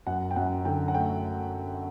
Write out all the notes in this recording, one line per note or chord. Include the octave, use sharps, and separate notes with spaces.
F#2 F#5
G5
F#2 F#5
D3 G5
F#5
A3 G5